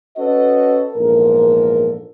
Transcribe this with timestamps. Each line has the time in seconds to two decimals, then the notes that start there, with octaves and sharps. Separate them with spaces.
0.17 C#4 F#4 A4 B4 D#5
0.95 A#1 E2 G#2 A4 A#4